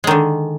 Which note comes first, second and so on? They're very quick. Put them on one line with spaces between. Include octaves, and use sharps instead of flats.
G#3 D#3 D3